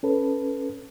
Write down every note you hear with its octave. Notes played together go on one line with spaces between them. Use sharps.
C#4 A4 B4